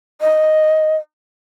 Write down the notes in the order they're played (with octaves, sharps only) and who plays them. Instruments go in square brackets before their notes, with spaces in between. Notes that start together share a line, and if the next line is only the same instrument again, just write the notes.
[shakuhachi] D#5